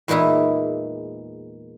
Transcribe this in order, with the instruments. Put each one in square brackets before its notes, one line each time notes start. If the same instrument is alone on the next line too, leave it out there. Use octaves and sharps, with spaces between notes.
[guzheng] E2 A#2 G#3 D#4 E4